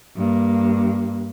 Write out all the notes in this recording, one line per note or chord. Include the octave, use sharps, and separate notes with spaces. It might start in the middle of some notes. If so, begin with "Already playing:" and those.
G2 A#3